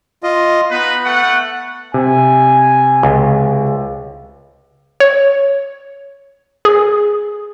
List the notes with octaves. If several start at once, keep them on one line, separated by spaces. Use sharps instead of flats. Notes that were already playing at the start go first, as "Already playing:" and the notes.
F4 D#5
B3 D#4 B4
A3 F#5
C3 G#5
C#2
C#5
G#4